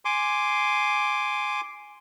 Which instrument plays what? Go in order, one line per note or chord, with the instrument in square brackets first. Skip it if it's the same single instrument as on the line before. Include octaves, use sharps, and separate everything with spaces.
[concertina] G#5 C6 D6